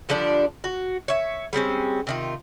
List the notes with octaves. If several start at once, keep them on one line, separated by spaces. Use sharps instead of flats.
D3 F3 G3 D4
F#4
C#5 E5
G3 G#3 C4 C#4
C3 D#3 F4